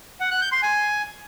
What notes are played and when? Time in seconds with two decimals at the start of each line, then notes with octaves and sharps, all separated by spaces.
0.20 F#5
0.31 F#6
0.41 G6
0.52 C6
0.63 G#5